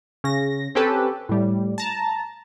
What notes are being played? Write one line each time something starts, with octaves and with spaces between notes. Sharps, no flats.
C#3 A#6
C4 C#4 G4 A4 B4
A2 G3
A5 A#5